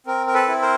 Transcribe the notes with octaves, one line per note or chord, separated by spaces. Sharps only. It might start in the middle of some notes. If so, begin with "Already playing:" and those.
C4 A#4
A#4
A4 B4
E4
A#4 C5